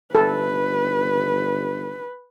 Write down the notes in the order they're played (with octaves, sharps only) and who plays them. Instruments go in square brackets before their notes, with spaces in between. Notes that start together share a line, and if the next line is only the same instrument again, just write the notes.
[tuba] G1 [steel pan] A4 [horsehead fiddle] B4